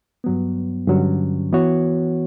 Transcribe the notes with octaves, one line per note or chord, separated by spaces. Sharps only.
G2 F#3 B3
G2 D3 F#3 C#4
E3 B3 F#4 C#5